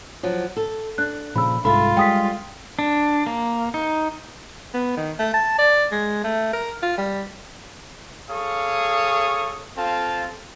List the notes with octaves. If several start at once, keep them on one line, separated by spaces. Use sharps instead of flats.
F3 F#3
A4
D4 F#6
A#2 C#3 F3 B5 E6
C2 G#2 F4 A4 E5 B5
G3 G#3 G5 D#6 B6
D4
A#3
D#4
B3
D#3
A3
A5
D5
G#3
A3
A#4
F4
G3
G#4 A4 C#5 F5 C#6 D#6
C4 F4 A4 F5 A5